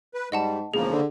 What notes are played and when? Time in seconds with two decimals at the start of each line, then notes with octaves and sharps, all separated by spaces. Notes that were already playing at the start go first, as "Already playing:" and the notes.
0.14 B4
0.32 G#2 G3 D#5 F#5 A5
0.74 E1 C#3 F3 A#3 G#4
0.93 D3